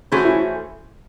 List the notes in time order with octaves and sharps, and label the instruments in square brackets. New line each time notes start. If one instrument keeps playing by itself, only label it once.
[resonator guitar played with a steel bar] E3 A3 C#4 G#4 C5 [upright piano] F#4
[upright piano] E4
F#4